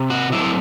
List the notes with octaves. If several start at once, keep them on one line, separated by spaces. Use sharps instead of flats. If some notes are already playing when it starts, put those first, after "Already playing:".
Already playing: C3
F#4
F#3 A3 C4 E4